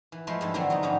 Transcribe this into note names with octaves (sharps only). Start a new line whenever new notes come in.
E3
F3 G#3 A3 E4 F4
G2 E3 F3 E4 A4
D3 E3 F#3 A3 C4
F#3 B3 D#4
G#2 D3 F3 G3 C#4